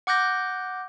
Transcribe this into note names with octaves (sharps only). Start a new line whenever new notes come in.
F#5 D6 F#6 G6 A#6